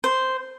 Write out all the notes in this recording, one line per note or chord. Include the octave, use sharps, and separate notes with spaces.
C5